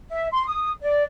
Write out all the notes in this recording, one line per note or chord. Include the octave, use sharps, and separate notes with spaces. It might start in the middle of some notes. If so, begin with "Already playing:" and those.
E5
C6
D#6
D5